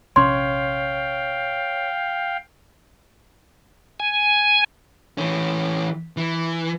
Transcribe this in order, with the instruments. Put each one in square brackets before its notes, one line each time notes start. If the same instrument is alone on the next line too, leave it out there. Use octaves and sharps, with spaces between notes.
[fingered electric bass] A#1 C3 C#4 [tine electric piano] C#5 [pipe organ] F5 G5 [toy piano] C6
[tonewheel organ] G#5
[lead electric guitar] E3 C#4
E3